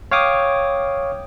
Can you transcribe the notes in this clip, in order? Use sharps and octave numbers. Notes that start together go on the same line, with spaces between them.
C#5 F5 G5 D6 D#6